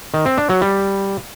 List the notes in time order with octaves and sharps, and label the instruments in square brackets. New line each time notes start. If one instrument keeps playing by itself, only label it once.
[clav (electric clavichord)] D#3
C4
D4
F#3
G3